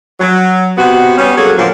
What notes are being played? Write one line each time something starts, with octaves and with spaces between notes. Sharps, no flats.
F#3
C3 B3 F#4
G3 B3 C#4
F#3 A#3 F#4 G#4 A4
A#2 D3 F3 F#3 A#3